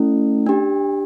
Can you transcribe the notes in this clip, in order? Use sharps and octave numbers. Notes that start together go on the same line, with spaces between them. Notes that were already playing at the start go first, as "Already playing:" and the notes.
Already playing: A3 C#4 E4
D4 G4